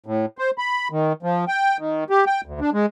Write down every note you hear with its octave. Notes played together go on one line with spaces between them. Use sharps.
A2
C5
B5
D#3
F3
G5
D#3
G4
G5
D2
D4
G#3